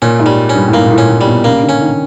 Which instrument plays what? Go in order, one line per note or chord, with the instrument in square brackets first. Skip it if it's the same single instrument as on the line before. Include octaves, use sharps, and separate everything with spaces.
[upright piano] A#2 [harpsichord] C#4
[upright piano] G#2
[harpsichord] G3
C#4
[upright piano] G2
A2
[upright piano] G#2 [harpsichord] A#3
[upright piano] A#2
A2
[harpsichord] C#4
[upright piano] A2
[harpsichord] G3
[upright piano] B2
[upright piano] C#3 [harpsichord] A#3
[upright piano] D3
[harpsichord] C#4
[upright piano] D#3